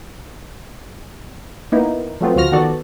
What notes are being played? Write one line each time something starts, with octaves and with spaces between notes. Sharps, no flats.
A#3 B3 D#4 E4
F3 F#3 A3 B3 C4 F4
D2 F3 F4 F#4 F6 A#6
D#3 F3 B3 F#4 A4 D5